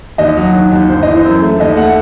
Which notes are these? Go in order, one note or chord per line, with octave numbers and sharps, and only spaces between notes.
D#2 D#5
F#3
D#3
D#2
G1 C5
E3 D#5
C5
F#2
A3
D#2 D#5
A3 F#5